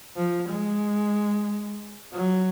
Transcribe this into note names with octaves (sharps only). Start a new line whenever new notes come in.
F3
G#3
F#3